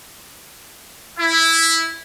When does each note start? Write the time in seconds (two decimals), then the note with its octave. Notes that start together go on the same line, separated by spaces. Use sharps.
1.19 E4